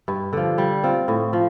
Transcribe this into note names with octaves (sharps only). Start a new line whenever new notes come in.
G2
D3 F3
G3
C4 F4
A2
F3